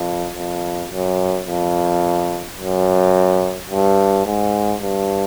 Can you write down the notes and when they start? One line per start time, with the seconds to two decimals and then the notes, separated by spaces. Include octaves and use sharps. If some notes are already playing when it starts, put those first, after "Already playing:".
Already playing: F2
0.35 F2
0.91 F#2
1.47 F2
2.59 F#2
3.70 G2
4.26 G#2
4.81 G2